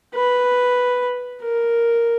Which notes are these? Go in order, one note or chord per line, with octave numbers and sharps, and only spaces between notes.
B4
A#4